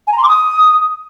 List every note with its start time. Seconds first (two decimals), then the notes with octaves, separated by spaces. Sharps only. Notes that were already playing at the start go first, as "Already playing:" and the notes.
0.07 G#5
0.12 A#5
0.18 C6
0.23 D6
0.28 D#6